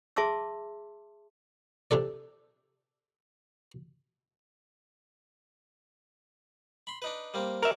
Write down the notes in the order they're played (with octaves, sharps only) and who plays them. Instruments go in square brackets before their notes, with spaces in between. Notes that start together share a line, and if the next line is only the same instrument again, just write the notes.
[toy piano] G#4 E5 A5 C6 D6 E6
[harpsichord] C3 D4 A4 D5
B5 C6
D4 D#4 B4
G3 A#3 C4
[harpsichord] F#4 C#5 D5 [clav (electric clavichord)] A#4 E5